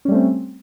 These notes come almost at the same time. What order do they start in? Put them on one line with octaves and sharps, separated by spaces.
C#4 G3 A3 C4